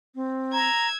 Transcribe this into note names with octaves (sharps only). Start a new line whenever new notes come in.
C4
A#5 E6 G#6